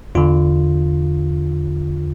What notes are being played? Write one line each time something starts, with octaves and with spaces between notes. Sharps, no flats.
E2 D3 F4